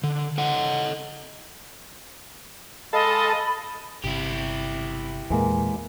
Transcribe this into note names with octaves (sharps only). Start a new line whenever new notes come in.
D3
A4 D#5 F#5
G#3 A4 D#5 F5 A5 B5
G1 C3 E4 G4
E2 A#2 E3 G#3 A#3